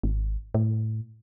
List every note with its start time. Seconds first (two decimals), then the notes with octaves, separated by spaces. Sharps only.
0.03 G#1
0.54 A2